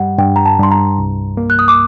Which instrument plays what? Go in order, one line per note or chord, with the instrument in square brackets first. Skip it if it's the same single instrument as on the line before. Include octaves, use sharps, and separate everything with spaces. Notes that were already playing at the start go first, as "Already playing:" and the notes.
Already playing: [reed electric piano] G2 G3 [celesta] F#5
[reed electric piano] G2 [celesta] G5
[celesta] A#5
A5
[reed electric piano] G2 [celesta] C6
[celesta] A#5
[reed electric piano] C2
A#3
[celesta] F#6
D#6
D6